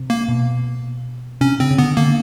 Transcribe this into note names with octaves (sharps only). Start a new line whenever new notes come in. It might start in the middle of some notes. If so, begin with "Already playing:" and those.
Already playing: C3
A#3
B2
C3 C#4
C#3 C4
C#3
D3 B3
D3 A#3